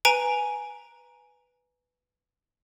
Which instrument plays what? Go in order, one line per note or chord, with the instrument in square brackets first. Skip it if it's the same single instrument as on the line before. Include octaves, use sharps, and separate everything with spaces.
[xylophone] B4 G#5 A#5 D7